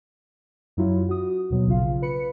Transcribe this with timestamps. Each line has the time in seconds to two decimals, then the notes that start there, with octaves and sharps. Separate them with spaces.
0.77 F#2 F#3 E4 F4
1.09 F#4 D#6
1.50 D#2 B2 F#3
1.67 A#1 C#3 F4 F5
2.02 B4 B5 C#7